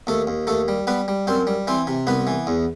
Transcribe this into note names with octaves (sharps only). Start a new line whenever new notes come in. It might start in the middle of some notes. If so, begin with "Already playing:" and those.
D#2 A3 A4
D#2
D#2 A3 A4
G3
G3 B3 B4
G3
F#2 C4 C5
G3
E3 C4 C5
C3
C2 B3 B4
E3
E2